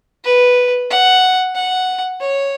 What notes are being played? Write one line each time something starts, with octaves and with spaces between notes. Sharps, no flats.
B4
F#5
F#5
C#5